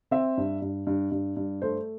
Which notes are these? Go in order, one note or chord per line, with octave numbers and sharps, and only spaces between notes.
C4 E5
G2
G2
G2
G2
G2
A3 C5